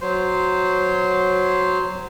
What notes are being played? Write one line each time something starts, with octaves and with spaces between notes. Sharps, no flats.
F#3 C5